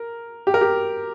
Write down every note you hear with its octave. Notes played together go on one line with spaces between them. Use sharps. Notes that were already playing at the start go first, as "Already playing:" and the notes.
Already playing: A#4
G4
A#4
G4